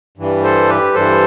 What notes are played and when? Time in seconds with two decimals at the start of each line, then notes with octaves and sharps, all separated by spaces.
0.17 G2 E3 G3
0.43 A4 C5
0.68 G4 B4
0.94 G2 E3 G3 A4 C5